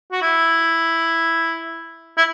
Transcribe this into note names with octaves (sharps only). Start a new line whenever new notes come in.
F#4
E4
E4